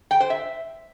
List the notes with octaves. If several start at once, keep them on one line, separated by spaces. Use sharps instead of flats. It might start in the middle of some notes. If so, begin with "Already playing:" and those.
G5
C5
E5